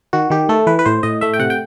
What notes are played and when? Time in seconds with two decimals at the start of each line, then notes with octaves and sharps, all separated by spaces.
0.13 D#3 F#4
0.30 D#3 G4
0.49 A3 A4
0.67 E3 B4
0.79 B4
0.86 A2 C5
1.03 A2 D#5
1.21 A3 E5
1.34 G5
1.39 C3 F#5
1.50 G5